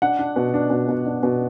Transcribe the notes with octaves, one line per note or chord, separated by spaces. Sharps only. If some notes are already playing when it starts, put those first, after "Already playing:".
D4 F#5
D4
B2
D4
B2
B2
D4
B2